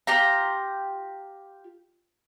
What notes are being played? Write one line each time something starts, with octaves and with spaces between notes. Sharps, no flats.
F4 G4 A#5